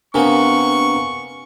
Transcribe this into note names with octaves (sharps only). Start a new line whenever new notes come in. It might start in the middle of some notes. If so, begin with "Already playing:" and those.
C3 A#3 B3 D4 A#4 G#5 C#6